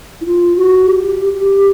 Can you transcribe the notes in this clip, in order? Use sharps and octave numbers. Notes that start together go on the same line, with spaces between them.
E4
F4
F#4
G4